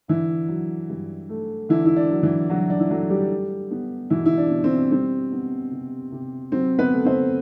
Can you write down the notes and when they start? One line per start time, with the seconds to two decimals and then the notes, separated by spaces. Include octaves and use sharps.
0.08 D3 E3 E4
0.48 F#3
0.89 G2
1.29 A3
1.69 D3 E3 E4
1.86 E4
1.96 D4
2.10 F#3
2.23 E3 E4
2.50 G2 F#3 F#4
2.70 D4
2.80 E4
2.90 F#3 A3 F#4
3.10 G3 G4
3.31 G3
3.71 B3
4.10 B2 E3 E4
4.26 E4
4.38 D4
4.51 B2
4.64 C4
4.91 G3 C4
5.32 B3
5.71 C3
6.12 C3
6.52 F#3 C4
6.78 B3 B4
6.93 A3
7.05 C4 C5